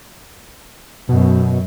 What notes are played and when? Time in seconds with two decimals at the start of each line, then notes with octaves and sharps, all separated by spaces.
1.09 F#2 B2